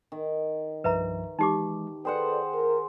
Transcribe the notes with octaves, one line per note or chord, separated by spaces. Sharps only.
D#3
C2 G2 F3 B4 E5 A#5
E3 G#3 D#4 G4 D6
G#4 A4 B4 C5 D5 F#5 G5
A#4